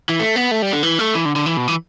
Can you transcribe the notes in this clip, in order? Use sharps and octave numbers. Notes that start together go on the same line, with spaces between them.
E3
A3
B3
A3
G3
D3
E3
A3
E3
D3
D3
E3
B2
E3